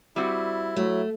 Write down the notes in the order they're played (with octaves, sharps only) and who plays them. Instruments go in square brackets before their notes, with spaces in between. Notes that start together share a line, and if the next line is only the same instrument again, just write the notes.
[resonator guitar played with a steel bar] G3 C4 F#4 [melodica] E4
[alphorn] F#3 [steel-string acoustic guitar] A3